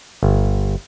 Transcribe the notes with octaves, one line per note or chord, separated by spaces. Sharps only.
G1